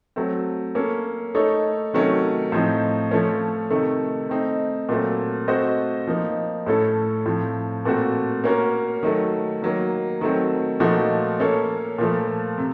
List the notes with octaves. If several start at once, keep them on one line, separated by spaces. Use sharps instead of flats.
F#3 A3 C4
A#3 C#4 A4
A3 D#4 A4 C#5
C3 D#3 F#3 A3 C#4
A2 F3 C4 D#4
F3 A3 C#4
C3 D#3 A3
A3 C4 D#4
A#2 F#3 A3 C4
A3 C4 F#4 C5 D#5
F3 A#3 D#4
A2 A3 C#4 A4
A2 F3 C4
A#2 A3 C4 F#4
A#3 C#4 F#4 A#4
D#3 F#3 A3
D#3 F#3 A#3
D#3 F#3 A3 C4
A#2 F3 A3 D#4 F#4
A#3 C#4 A4 C#5
A#2 F3 A3
C3